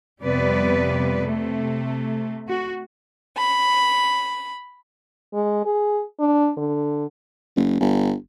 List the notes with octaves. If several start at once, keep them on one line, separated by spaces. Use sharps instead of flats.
F2 C3 G3 B3 B4 D5
C3 A3
F#4
B5
G#3
G#4
D4
D3
F#1
G1